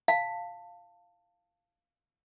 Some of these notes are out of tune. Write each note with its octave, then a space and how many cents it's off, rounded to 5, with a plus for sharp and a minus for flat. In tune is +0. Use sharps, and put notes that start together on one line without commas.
F5 +0 A5 +15